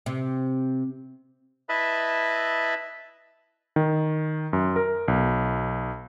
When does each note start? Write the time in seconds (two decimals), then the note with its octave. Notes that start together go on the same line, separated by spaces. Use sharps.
0.06 C3
1.69 E4 B4 D#5 E5 A5 B5
3.76 D#3
4.53 F#2
4.76 A#4
5.08 B1